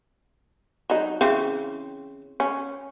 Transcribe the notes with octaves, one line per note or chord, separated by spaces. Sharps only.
F#3 D#4
C#3 E3 C4
C#4